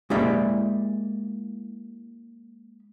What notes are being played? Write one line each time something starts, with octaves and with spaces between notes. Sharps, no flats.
G#3 A#3 E4 G4 D5 E5